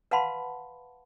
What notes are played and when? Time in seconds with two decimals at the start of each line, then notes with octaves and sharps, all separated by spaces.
0.11 B4 F5 F#5 A5 B5 C6